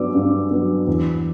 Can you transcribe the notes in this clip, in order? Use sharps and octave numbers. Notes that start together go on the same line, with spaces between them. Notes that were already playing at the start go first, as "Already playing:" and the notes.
Already playing: G2 F#3 B3 D5 D6 E6
G2
F#3 B3
E2